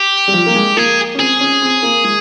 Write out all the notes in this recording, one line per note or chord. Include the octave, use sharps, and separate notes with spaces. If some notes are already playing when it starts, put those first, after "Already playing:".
Already playing: G4
G3
F3
A#3
G#3
A#3 G#4
C#4
C4 G#4
C#4
C4
A#3
G#3